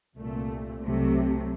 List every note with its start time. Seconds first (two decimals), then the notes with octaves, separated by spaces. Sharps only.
0.16 C2 A#2 A3
0.82 C2 C3 F#3 A3